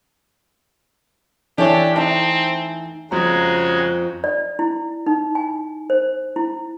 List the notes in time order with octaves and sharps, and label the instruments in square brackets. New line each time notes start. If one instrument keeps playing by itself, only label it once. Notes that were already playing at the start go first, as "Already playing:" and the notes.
[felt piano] E3 [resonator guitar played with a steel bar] D4 A4 C#5 [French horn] G4
[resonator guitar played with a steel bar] A3 D#4 [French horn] C4
[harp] F2 A#5 [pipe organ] C#3 G#3 F#4
[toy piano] D5
E4
D#4
G#5
C5
E4